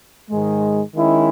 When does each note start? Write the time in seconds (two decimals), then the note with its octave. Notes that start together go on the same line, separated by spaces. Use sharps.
0.30 G#2 D#3 G#3
0.95 D#3 G#3 C#4 E4